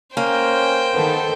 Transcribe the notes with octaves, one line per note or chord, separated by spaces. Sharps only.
A#3 C#4 C5 G5
D#3 B3 A4